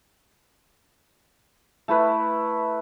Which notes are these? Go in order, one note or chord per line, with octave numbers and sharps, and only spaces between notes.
A3 E4 B4